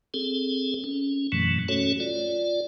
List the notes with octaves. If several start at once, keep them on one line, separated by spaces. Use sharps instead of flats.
C4 G#4 A4
C#4
F#2 B2 E3 F#3 A3
A3 C#4 F#4 A4 C#5
F4 D5